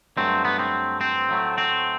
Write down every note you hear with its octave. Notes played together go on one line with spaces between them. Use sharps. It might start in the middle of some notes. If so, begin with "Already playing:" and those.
G2 F#3 A3 C4
B3
C4
C4
A2 F#3 A3
C4